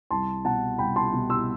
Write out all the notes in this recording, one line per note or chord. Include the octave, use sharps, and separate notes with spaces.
C2 A5 C6
B2 F#5 A5
C2 G5 B5
A5 C6
B2
C6 E6